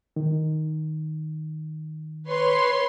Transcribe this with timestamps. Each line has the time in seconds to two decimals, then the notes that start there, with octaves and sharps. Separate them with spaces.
0.16 D#3
2.28 B4 C#5 C6